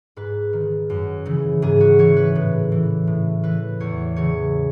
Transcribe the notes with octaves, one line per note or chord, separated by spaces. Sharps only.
G#2 B4
D#3
F#2
C#3 E3
G#2 G#4
F#4
E3 C#5
B4
A2
E3
A2
E3 B4
E2 C#5
C#3 E3 C#5